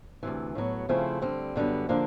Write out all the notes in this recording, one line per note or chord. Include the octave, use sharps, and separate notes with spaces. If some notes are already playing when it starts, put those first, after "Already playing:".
D2 C3 E3
A2 F#3 B3
C#3 F3 A3 C4 E4
D3 G3 C4
F#2 D3 G3 B3
D3 F3 A#3 D4